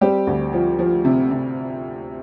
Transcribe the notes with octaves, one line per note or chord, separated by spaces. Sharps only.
G3 C4 G4
D2
F3
F3
C3
C3